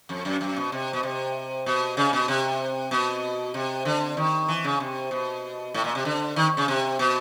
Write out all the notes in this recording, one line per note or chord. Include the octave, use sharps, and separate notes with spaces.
F2
F#2
F#2
B2
C3
B2
C3
B2
C#3
B2
C3
B2
C3
D3
D#3
E3
C#3
C3
B2
A2
A#2
C3
D3
D#3
C#3
C3
B2